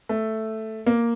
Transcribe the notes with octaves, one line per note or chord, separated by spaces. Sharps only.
A3
A#3